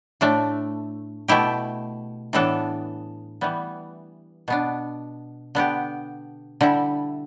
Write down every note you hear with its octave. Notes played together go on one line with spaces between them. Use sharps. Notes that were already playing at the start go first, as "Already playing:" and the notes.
A2 A3 D4
B2 A3 E4 G4
A2 E3 B3 D4 A4
E3 G3 B3
B2 B3 D4
D3 B3 D4 G4
D3 G3 E4